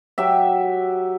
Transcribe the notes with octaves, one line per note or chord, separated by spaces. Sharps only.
F#3 G4 E5